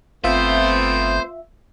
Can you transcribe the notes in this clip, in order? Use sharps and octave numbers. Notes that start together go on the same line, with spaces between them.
G1 A3 B3 C4 F4 C5 E5 G6